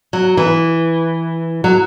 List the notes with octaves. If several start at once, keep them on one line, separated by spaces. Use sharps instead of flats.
F#3
E3
F#3